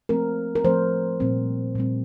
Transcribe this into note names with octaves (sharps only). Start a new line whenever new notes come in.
F3 A3 C4 A#4
A#4
F3 A3 C4 C5
A#2 G3 C4
A#2 G3 C4